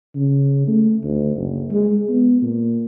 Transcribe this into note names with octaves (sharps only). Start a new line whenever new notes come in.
C#3
A3
D2
F#1
G#3
B3
A#2